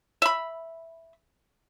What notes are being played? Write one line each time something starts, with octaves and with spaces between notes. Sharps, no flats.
E5 B5